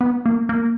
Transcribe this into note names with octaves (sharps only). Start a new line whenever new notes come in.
B3
A#3
A#3